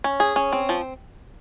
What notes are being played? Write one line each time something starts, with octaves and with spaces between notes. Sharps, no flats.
C#4
G#4
C#4
C4
F3